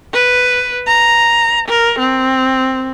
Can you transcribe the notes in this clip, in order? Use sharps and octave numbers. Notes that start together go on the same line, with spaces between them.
B4
A#5
A#4
C4